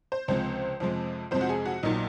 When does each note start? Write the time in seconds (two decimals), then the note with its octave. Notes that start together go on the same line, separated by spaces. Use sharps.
0.12 C5
0.28 C#2 C3 F3 G#3 C5
0.80 F2 C3 F3 G#3
1.31 F2 C3 F3 G#3 C5
1.41 F#4
1.49 G#4
1.65 F#4
1.83 A#1 A#2 F#3 D#4